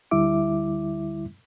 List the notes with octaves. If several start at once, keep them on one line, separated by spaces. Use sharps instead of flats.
D2 D3 G3 E4 E5 D6